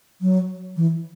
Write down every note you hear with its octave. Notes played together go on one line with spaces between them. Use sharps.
F#3
E3